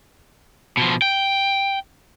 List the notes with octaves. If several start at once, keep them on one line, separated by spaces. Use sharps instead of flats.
B2 F3
G5